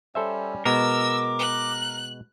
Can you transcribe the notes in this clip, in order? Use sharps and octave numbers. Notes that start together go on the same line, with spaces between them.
G3 C#4 A4 C5 E5
B2 G#3 B3 A#4 D6 E6
F#6